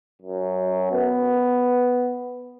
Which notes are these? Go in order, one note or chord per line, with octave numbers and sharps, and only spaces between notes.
F#2
B3